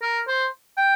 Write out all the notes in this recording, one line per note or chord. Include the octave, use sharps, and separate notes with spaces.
A#4
C5
G5